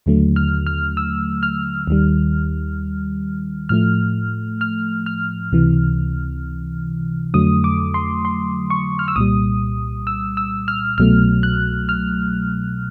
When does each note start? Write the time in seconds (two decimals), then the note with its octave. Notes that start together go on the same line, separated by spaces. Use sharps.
0.06 D#2 D3 F#3 A3
0.36 F6
0.67 F6
0.97 E6
1.43 F6
1.87 D#2 D#3 G3
3.69 A2 F3 A3 F6
4.61 F6
5.06 F6
5.52 C#2 C3 E3
7.34 F2 D3 F#3 A3 D#6
7.64 D6
7.94 C6
8.25 C6
8.70 C#6
8.99 F6
9.08 E6
9.16 C2 A#2 G3 D#6
10.07 E6
10.37 E6
10.68 F6
10.98 C2 B2 F#3 A3 F6
11.43 F#6
11.89 F6